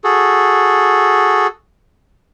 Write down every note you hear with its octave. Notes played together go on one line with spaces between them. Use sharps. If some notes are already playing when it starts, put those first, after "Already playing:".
F#4 G#4 A4